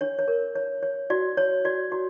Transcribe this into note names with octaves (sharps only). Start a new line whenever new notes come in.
D4 C#5
C#5
A#4
C#5
C#5
F#4 D5
C#5
F#4 D5
F#4